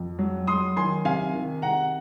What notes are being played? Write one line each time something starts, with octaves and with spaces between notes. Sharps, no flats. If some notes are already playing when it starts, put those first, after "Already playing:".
Already playing: F2
F#3
F#3 C6 D#6
D#3 G#5 C6
C3 F5 G#5
D#3
C3 F#5 A#5